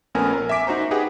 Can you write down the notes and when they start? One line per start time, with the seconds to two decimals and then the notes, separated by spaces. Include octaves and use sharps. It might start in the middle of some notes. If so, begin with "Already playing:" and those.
0.15 A#1 A3 B3 C#4 A#4 G#5
0.33 A#4
0.49 E5 G#5 D6 B6 D7
0.67 D#4 F#4 C5 A#5
0.91 D#4 G4 G#4 B4 F#5 G5